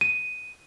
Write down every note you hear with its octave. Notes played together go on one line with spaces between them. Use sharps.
D#7